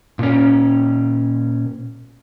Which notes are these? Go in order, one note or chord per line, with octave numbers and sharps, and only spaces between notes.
A#2 C#4